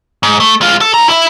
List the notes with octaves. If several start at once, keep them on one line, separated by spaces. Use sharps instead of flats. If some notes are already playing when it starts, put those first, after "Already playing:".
G#2
A3
G#3 F4
A4
E4 A#5
E4 E5